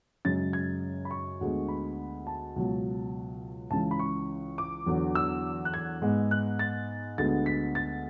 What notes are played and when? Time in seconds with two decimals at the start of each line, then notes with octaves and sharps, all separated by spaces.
0.25 F#2 C#3 G#3 A6
0.53 G#6
1.05 B5
1.11 C#6
1.41 D2 D3 G#3 B3
1.68 B5
2.27 A5
2.56 C#2 B2 F#3
3.71 C#2 C#3 E3 A5
3.91 B5
3.99 C#6
4.58 D6
4.86 E2 D3 F#3 B3
5.15 E6
5.65 F#6
5.74 G#6
6.02 G#2 G#3 B3
6.31 F#6
6.59 A6
7.18 D2 D3 G#3 B3 A6
7.46 B6
7.75 A6